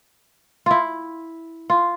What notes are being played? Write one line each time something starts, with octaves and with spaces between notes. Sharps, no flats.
E4 F4
F4